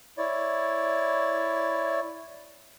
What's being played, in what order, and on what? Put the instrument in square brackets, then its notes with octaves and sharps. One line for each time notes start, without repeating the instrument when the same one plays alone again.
[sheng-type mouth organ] E4 C#5 D5